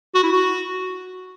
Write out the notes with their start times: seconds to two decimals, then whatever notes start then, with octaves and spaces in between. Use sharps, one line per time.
0.15 F#4
0.23 E4
0.33 F#4